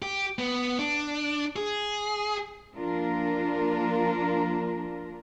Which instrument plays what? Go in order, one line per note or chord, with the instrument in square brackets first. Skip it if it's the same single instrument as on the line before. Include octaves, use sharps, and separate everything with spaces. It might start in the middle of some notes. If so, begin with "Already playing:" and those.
[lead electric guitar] G4
B3
D4
G#4
[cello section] F3 A#3 D4 F4 A#4